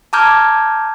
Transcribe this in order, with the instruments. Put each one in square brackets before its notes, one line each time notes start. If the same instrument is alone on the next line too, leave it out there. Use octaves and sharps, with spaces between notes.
[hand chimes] A5 A#5 D6 F6 G6 G#6